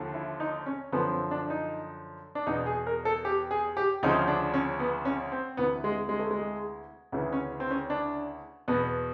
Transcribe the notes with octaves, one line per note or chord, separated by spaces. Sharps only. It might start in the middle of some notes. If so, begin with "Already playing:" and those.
Already playing: D#2 D3 F3
E4
D#4
C#4
F#2 D3 F3 B3
C4
D4
D#4
D4
E2 B2 D#4
G#4
A#4
A4
G4
G#4
G4
D2 C#3 F3 D#4
D4
C#4
B3
C#4
C4
D2 C3 E3 B3
G#3
G#3
A3
G#3
D2 C#3 E3
C#4
C4
C#4
D4
E2 B2 B3